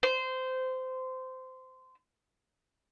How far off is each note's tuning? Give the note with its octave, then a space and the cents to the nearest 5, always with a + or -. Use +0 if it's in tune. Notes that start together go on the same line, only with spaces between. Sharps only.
C5 -20